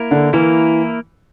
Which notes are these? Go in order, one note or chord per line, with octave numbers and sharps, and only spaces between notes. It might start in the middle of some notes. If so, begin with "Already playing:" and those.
Already playing: A#3 E4 A#4
D3
E3 A#3 E4 A#4